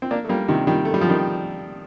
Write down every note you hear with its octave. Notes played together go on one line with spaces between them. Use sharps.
C4
A#3 D4
A3
G3 A#3
C3 D#3
D#3 G3
A3
G3
F3
D#3 G3